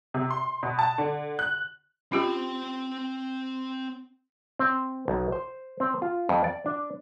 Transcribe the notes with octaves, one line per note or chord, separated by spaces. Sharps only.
C3
C6
B2
A5
D3
F#6
C4 C#4 F4 G4 G5
C4
B1
C5
C4
F4
F2
D5
D4